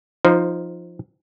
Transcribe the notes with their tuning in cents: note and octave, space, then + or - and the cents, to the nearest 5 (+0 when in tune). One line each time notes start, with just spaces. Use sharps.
F3 +0 D#4 +0 C5 -25